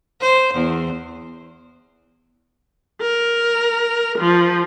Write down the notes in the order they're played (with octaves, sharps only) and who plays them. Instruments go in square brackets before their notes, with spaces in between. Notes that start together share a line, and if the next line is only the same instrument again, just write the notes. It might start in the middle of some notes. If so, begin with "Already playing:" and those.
[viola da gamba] C5
E2
[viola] A#4
F3